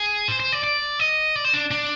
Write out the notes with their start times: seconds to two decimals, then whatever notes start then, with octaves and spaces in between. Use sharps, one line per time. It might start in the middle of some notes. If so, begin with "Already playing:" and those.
Already playing: G#4
0.28 C5
0.40 C5
0.52 D5
0.64 D5
0.99 D#5
1.36 D5
1.45 C5
1.54 D4
1.71 D4